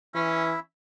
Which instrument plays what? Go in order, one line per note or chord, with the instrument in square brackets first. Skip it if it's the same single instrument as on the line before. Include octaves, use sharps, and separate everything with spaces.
[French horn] E3 [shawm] C#4 [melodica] E4 E5